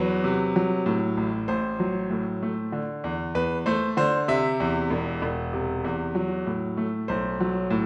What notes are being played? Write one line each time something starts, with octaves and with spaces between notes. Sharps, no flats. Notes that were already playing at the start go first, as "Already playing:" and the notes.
Already playing: E2 F#3 B4
C3
F#3
A2
A1
A1 C5
F#3
A2
A3
D3
E2
E2 B4
A3 C5
D3 C5
C3 E5
E2
E1
E1
C3
E2
F#3
A2
A3
B1 C5
F#3
A2